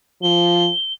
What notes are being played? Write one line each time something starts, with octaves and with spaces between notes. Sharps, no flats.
F3 G7